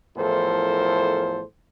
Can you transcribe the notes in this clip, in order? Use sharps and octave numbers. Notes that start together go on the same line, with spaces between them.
E2 A2 F3 A4 A#4 C5